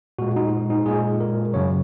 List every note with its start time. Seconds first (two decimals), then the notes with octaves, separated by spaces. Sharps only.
0.19 A#2 G#3 F#4
0.36 D#4
0.70 D#4
0.86 A#2 G#3 G#4
1.20 A#4
1.53 F#2 C#3 F#3 C#5